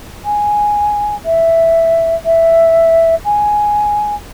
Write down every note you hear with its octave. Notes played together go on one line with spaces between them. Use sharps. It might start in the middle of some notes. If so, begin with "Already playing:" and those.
G#5
E5
E5
G#5